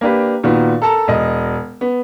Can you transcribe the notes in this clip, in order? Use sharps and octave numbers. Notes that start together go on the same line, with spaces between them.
A#3 D4 G4 B4
A#2 D#3 B3 F#4
A4 A#4 A5 A#5
E1 D#5
B3